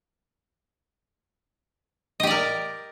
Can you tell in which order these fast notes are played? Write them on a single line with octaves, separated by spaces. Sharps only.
D#5 G4 D5 A#4